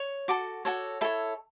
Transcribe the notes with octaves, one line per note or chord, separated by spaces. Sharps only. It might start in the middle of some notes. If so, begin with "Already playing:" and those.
Already playing: C#5
F#4 A4 D6
F#4 A4 C#5
E4 A4 C#5